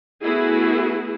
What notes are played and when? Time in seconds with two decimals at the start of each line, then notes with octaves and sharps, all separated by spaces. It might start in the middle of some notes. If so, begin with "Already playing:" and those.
0.23 A3 B3 E4 F#4 G#4